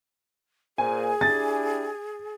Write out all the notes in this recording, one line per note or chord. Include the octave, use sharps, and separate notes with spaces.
A#2 G#4 C5 G#5
D4 E4 G4 A6